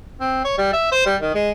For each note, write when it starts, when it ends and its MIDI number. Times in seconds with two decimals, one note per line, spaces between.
0.20 0.43 60
0.45 0.57 73
0.58 0.73 55
0.73 0.87 76
0.92 1.05 72
1.06 1.16 55
1.21 1.33 51
1.35 1.50 56